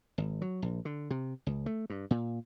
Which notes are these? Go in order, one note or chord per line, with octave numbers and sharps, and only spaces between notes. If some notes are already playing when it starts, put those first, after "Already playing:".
G#1
F#3
A#1
D3
C3
C#2
A3
G2
A#2